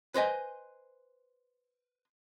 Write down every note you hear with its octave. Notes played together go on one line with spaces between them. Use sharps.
B4 C5 D#5 G#5